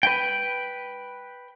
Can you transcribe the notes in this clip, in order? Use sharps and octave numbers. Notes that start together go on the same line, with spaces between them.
B4 G5